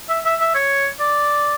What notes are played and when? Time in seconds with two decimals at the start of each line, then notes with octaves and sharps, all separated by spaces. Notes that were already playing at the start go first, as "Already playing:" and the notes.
0.09 E5
0.25 E5
0.40 E5
0.55 C#5
1.00 D5